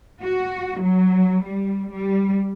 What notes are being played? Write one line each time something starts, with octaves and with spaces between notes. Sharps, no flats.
F#4
F#3
G3
G3